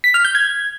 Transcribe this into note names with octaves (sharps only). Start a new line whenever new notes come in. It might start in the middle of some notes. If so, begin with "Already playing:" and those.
B6
F6
G6
G#6